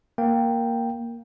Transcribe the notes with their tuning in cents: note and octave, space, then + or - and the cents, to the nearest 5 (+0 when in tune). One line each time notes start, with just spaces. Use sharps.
A#3 +0 G5 +0